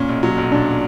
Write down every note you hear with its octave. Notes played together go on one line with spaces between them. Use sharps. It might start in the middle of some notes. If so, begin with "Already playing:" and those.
Already playing: A#2 C#4
B1
F#3
B1
A#2 D4